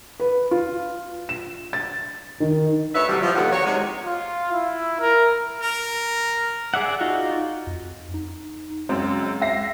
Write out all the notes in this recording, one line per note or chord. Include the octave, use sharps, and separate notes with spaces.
B4
F4
E7
A6
D#3
D2 B4 C#5 E5
A2 C3 F#3 G3
F3
D#2 B2 D3 G4 F#5
D#3 F#4 C#5
C3 G#3
F4
E4
A#4
A#4
G#4 D5 E5 F#5
D#4 F4 F#4
F2
D#4
C#2 F#2 G#3 C4
E5 A#6 C7